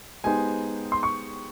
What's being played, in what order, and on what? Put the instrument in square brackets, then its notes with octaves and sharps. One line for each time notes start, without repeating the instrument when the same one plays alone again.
[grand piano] G#3 B3 D#4 G4 C5 [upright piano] G#5
[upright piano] C6
C#6